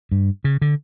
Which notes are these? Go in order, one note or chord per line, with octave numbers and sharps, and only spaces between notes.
G2
C#3
D3